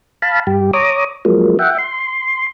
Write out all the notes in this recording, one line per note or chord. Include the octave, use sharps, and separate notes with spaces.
F5 A5 B5
G2 G4
C#5 A#5 D6 D#6
F3 F#3 G#3 A#3
E5 F#5 G5
C6